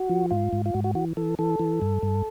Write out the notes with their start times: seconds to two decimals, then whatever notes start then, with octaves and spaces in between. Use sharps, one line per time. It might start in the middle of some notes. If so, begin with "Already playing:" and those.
Already playing: F#4
0.09 F3
0.31 G#2 F4
0.53 G#2
0.66 F4
0.74 G#2 F#4
0.84 F#4
0.95 E3 F#4
1.17 E3 A4
1.39 E3 A4
1.59 E3
1.82 G2
2.03 G2